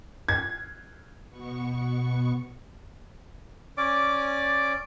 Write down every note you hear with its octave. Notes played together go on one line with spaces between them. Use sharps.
G#6
B2 B3 C#6
C#4 D5 D6